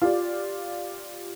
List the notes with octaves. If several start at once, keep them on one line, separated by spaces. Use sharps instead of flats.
F4 G4 D5